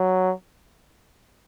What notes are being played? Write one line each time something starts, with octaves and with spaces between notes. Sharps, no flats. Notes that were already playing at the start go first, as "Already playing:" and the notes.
Already playing: F#3